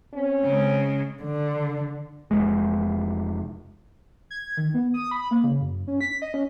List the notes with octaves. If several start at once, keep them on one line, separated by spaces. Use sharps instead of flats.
C4 C#4
C#3 G#3
D3
F1 C#2 G#3
G#6
D#3
B3
D#6
B5
A#3
C#3
F#2
C#4
B6
D#5
C#4